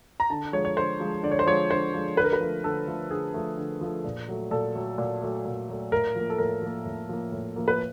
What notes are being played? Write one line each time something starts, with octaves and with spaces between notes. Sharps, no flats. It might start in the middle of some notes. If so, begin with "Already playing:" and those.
A#5
D3 A5
F3 G#3 C#5
C#5
D3 C5
F3 G#3
D3 D5
C#5
C5
F3 G#3 C#5
D3 C5
F3 G#3
D3 B4
A#4
B4
F3 A3
D3 A4
F3 A3
D3 G#4
F3 A3
D3
F3 A3
A#2
F#3 A3
A#2 A4
F#3 A3
A#2
F#3 A3
A#2
F#3 A3
A2 A#4
F3 A#3
A4
A2 A#4
F3 A#3
A2
F3 A#3
A2
F3 A#3
B4